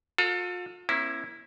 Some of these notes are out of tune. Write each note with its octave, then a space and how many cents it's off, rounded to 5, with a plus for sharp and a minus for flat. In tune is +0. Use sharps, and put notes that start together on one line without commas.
F4 +40 A4 +30
A#3 +40 C#4 -35 E4 +0